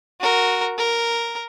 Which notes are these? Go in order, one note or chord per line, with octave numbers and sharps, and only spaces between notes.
F#4 A#4
A#4